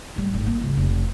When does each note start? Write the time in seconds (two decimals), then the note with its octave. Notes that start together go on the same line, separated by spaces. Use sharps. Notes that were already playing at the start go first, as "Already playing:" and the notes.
0.16 A2 G3
0.33 G#1 A2
0.46 A#3
0.61 C#2
0.77 F1